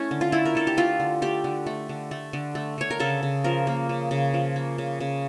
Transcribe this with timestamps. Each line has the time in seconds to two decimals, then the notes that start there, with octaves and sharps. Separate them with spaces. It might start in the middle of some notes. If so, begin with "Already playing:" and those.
Already playing: A3 C#4 E4
0.11 D3
0.21 F4
0.32 A3 E4
0.45 A#4
0.55 D3 A4
0.67 G4
0.77 A3 F4
1.00 D3
1.22 A3 G4
1.44 D3
1.66 A3
1.89 D3
2.11 A3
2.33 D3
2.55 A3
2.78 D3 C#5
2.91 A#4
3.00 C#3 A4
3.23 C#3
3.44 F3 A#4
3.67 A#3
3.89 C#3
4.11 C#3
4.34 F3
4.56 A#3
4.78 C#3
5.00 C#3